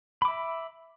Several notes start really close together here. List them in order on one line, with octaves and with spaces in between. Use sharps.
B5 D6 E5